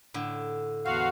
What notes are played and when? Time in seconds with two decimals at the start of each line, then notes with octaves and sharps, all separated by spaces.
0.14 A2 D3
0.85 E2 F#4 C5 F5